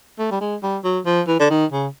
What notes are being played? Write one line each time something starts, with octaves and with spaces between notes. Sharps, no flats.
A3
G3
G#3
G3
F#3
F3
E3
D3
D#3
C#3